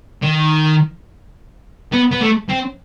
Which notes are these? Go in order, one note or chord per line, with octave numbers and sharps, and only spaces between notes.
D#3
B3
B3
A3
C4